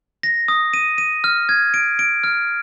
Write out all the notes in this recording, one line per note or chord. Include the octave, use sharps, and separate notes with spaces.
A#6
D#6
D#7
D#7
F6
G#6
D7
D7
F6